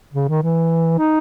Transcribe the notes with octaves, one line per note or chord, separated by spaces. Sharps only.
C#3
D#3
E3
D#4